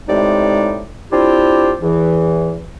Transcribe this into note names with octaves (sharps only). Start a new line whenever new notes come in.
A2 C3 G#3 D#4 D5
C4 D4 E4 F4 G4
E2 E3